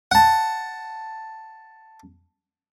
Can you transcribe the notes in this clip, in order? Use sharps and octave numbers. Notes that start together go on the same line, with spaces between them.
F#5 A5